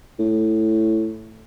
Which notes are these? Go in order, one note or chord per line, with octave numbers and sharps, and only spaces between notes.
A2